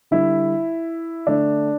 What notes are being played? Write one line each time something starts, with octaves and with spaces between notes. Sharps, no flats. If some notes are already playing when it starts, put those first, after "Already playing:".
D3 G3 E4
D3 A3 D4